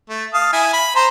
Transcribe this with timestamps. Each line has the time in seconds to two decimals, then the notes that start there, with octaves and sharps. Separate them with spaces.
0.09 A3
0.33 F5 A5 D#6
0.53 E4 E5 G#5
0.73 B5
0.96 C5 A#5 C6